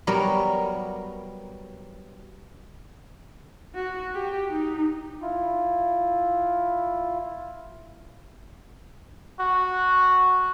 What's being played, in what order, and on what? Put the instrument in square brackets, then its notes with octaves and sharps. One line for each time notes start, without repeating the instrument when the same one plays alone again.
[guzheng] F#3 G3 B3 A#4 C#5
[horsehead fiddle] F#4
G4
D#4
[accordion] E4 F4
[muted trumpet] F#4